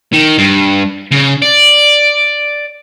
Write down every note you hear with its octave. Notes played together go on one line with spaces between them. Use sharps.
D#3
G2
C#3
D5